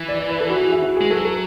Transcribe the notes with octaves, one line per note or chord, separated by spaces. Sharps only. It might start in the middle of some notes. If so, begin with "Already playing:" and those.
Already playing: E3
D5
D5
B4
A4
F#4
G#4
E4
F#4
G#3 G#4
F#3 A4
A4